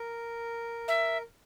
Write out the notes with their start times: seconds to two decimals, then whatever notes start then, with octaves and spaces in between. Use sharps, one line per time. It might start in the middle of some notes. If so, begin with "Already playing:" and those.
Already playing: A#4
0.88 E5